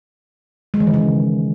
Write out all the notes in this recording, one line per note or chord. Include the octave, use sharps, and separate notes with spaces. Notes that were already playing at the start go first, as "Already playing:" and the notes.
G#3
E3
D#3
C#3